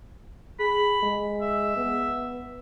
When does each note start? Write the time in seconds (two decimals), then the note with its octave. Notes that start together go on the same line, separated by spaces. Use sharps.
0.60 G#4 B5
1.03 G#3
1.42 E5
1.77 B3